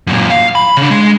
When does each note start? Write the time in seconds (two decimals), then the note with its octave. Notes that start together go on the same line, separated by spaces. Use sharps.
0.07 F#2 A#2
0.30 F5
0.55 B5
0.77 C#3 D4
0.91 G#3